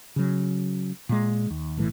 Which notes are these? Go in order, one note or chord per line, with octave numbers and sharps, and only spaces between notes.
C#3 F#3
A#2 G#3
D#2
B1 A2 E3